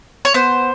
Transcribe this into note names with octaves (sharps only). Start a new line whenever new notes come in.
C#5
B3 C5